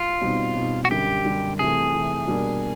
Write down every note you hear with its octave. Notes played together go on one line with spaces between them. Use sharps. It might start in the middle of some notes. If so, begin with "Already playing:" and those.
Already playing: F4
B2 G3 C4 D#4
B2 G3 C4 D#4
F#4
F#2 D3 G3 G4
F#2 D3 G3
C3 E3 A3 G#4
C3 E3 A3
B2 G3 A#3 D4